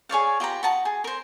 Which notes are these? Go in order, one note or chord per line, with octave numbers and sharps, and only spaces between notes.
G#4 C#5 D5 F5
F4 G4 B4 A#5
F#4 D#5 A5 A#5
G#4
A#4 C5